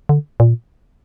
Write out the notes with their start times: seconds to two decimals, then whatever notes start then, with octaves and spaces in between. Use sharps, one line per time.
0.09 D3
0.40 A#2